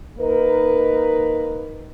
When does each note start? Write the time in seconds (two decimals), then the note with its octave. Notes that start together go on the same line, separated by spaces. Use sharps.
0.18 A#3 D#4 A#4 B4